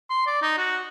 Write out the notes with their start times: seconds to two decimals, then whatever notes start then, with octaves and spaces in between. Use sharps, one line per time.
0.10 C6
0.27 D5
0.42 D#4
0.58 F#4